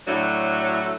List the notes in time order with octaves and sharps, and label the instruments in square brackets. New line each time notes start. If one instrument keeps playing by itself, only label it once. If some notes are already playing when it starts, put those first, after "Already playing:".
[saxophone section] A2 F#3 A3 D4